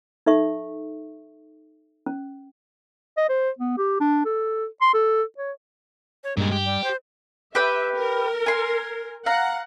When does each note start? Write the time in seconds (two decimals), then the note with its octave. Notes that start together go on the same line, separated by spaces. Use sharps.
0.26 D#4 A4 E5 C#6
2.06 C#4
3.17 D#5
3.29 C5
3.59 B3
3.78 G4
4.00 D4
4.25 A4
4.81 C6
4.94 A4
5.38 C#5
6.24 C#5
6.37 G2 A#2 G3 G#3
6.52 G4
6.65 G3
6.84 C5
7.55 G4 B4 E5 G5
7.95 A#4
8.46 G#5 C6
9.26 F5 F#5 A#5